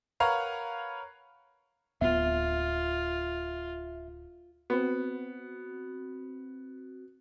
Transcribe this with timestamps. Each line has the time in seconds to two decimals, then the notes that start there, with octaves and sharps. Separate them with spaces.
0.20 A#4 B4 C#5 F5 F#5 A#5
2.01 D1 B3 F4 E5
4.70 B3 C4 F#4